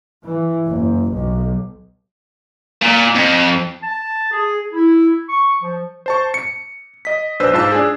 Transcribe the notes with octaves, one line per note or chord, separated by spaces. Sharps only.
E3
F#1
B1
A#2
F2
A5
G#4
E4
C#6
F3
C5 A5 C#6
C#7
D#5 B6
B1 D4 B4 C5 E6
G#2 F4 C5 A5 E6
D4 G#4